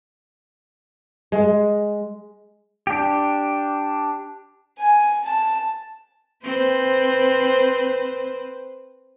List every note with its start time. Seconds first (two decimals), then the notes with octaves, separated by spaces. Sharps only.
1.32 G#3
2.87 D4 G4
4.79 G#5
5.25 A5
6.44 C4 B4 C5